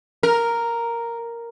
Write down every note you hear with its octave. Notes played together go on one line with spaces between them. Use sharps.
A#4